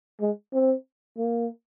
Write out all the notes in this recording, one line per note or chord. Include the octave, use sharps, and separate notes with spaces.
G#3
C4
A#3